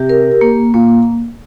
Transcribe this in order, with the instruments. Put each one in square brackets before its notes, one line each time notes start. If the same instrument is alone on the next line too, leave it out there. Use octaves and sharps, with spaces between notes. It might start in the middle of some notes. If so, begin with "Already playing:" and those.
Already playing: [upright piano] C3 [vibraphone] G4
[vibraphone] A#4
A#3
[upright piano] A#2 [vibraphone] A#3